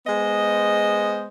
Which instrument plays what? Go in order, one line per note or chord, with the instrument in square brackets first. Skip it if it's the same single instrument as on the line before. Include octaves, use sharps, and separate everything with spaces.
[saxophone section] G#3 B3 C5 D#5